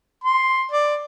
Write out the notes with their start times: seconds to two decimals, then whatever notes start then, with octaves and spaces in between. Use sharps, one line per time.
0.24 C6
0.71 D5